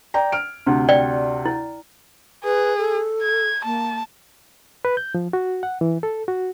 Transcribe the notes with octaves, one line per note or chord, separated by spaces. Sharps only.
D5 G5 A#5
F6 D7
D2 C3
D5 G5
E4
G#4 B4
A4
G#6
A#3 A5
B4
G6
F3
F#4
F#5
E3
A4
F#4